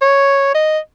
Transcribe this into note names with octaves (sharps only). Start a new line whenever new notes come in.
C#5
D#5